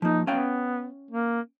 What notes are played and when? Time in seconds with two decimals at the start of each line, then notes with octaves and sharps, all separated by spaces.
0.02 F3 A#3 D#4
0.27 B3 C#4 F5 G5
1.11 A#3